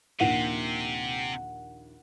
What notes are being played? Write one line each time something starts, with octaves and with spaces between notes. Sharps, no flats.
A#1 D#2 C3 F#5